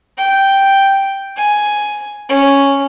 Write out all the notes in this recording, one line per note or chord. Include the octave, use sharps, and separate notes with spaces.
G5
G#5
C#4